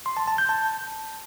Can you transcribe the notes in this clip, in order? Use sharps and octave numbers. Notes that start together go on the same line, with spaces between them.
C6
A5
A5
G6
A5